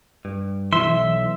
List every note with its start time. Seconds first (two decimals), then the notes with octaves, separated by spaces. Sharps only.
0.25 G2
0.73 B1 E3 E4 E5 C6